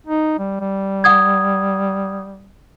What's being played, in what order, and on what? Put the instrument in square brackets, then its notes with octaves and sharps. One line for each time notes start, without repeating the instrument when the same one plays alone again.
[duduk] D#4
G3
G3
[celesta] F#5 D#6 G#6